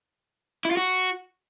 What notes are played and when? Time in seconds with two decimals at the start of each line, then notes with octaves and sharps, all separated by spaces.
0.65 E4
0.71 F4
0.77 F#4